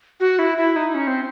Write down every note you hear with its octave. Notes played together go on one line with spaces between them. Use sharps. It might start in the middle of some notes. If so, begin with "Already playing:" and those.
F#4
E4
E4
D#4
C#4
C4